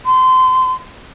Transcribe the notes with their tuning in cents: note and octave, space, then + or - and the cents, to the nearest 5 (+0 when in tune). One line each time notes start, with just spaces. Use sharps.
C6 -25